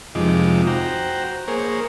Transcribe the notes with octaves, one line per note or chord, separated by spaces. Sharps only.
F2 C3 F3 G#3 D#4 D6
F#4 C5 G5 A#5
A#3 G#4 A#4 C5 C#5